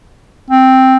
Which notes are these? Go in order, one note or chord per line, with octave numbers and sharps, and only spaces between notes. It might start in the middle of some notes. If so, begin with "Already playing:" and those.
C4